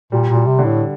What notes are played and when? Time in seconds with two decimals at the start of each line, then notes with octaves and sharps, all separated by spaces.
0.12 A#2 G3
0.29 A#2
0.35 G3
0.47 C3
0.58 D3
0.65 A2